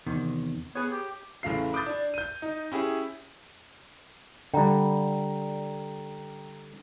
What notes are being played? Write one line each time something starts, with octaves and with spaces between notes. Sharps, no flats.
E2 C3 D#3
B3 G#4 C#5
G4
A1 A2 C#3 F5 C7
B5 D6 D#6 G6 A6
D4
G6 D#7
D#4
C#4 E4 G4 G#4
D3 G3 G5 A#5